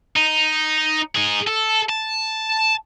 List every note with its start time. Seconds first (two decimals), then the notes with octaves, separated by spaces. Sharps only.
0.16 D#4
1.15 D#4 G#4
1.47 A4
1.89 A5